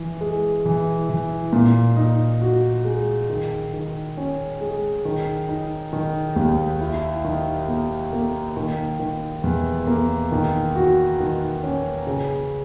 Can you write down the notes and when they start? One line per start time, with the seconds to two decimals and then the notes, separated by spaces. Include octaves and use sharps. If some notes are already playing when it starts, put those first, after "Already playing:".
Already playing: E3
0.21 G#3
0.65 E3
1.09 E3
1.53 A#2
1.97 D#4
2.42 F#4
2.85 G#3
3.30 D#3
3.73 D#3
4.17 C#4
4.61 G#3
5.05 D#3
5.49 D#4
5.93 D#3
6.36 D#2
6.81 E4
7.25 D#3
7.68 A#3
8.13 A#3
8.57 D#3
8.99 D#3
9.44 E2
9.87 A#3
10.32 D#3
10.76 F#4
11.20 D#3
11.63 C#4
12.07 C#3